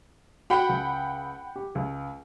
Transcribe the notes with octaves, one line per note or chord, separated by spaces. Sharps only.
F#4 F#5 G5 B5
C#2
G4
C#2